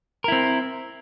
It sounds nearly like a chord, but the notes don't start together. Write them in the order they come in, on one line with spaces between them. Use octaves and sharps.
A#4 E4 C4